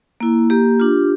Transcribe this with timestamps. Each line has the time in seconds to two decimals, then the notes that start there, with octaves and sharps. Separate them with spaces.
0.20 A#3 E4
0.50 A#3 G4
0.80 D4 F4